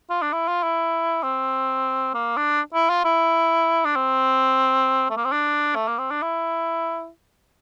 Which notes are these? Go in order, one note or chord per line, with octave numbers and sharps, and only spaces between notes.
F4
D4
E4
F4
E4
C4
A#3
D4
E4
F4
E4
D4
C4
A3
A#3
C4
D4
A3
A#3
C4
D4
E4